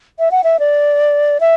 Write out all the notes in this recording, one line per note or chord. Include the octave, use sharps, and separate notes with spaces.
E5
F#5
E5
D5
E5